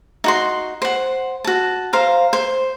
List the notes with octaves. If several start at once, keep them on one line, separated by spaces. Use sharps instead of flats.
D#4 F#4 C6
C5 F#5
F#4 A5
C5 F5 A#5
C5